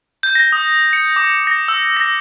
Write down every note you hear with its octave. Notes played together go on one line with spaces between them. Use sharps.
G6
A#6
D#6
C#7
D6
A#6
E6
A#6